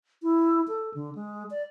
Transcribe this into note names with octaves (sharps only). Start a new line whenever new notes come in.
E4
A4
D3
G#3
D5